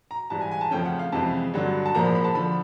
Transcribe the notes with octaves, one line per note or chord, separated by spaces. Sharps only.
A#5
G#2 E3 G3 A5
G#5
G#5
A5
F2 C#3 F3 A3 C#4 G5
F#5
F5
F2 C3 E3 G#3 A5
G2 D3 F#3
A5
A#1 G#2 F3 A#3 A#5
B5
B5
A5
D3 F3 B5